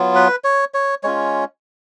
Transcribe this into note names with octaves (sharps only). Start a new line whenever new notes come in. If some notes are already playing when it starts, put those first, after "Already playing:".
Already playing: F#3 B3 F4
B4
C#5
C#5
G#3 C#4 F4 C#5